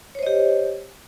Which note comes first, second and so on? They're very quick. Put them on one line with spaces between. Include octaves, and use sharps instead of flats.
C#5 C5 D#5 G4